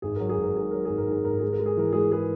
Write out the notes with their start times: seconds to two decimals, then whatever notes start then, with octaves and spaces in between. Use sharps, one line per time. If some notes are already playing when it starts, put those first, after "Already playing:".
0.02 G#1 G#4
0.16 F#3 A#4
0.29 G#4
0.38 G#1
0.43 A#4
0.56 G#2 G#4
0.71 F#3 A#4
0.85 G#1 G#4
0.98 A#4
1.08 G#2 G#4
1.25 G#1 A#4
1.39 G#3 G#4
1.53 A#4
1.59 G#3
1.66 G#4
1.77 E3 A#4
1.93 G#3 G#4
2.12 G#4 B4